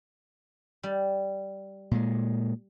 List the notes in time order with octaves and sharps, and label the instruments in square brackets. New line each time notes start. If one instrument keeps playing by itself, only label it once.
[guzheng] G3
[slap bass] A#2 G#3